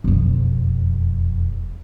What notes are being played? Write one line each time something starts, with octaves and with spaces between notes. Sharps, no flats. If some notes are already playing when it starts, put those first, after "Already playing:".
E1 F2